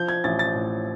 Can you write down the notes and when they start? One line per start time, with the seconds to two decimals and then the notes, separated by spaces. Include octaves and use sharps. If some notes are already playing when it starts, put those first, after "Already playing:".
Already playing: F3 G6
0.08 G#6
0.24 A1 A6
0.39 A6
0.55 A2